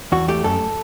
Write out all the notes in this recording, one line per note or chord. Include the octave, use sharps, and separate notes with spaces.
E2 F#4
A3 G4
F#2 A4